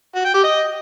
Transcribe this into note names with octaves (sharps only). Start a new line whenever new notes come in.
F#4
G5
G4
D#5